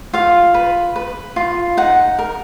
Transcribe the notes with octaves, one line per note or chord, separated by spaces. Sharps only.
F4 F5
B4
B4
F4
D#4 F#5
A#4